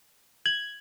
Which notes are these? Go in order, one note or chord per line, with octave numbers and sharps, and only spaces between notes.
G#6 F#7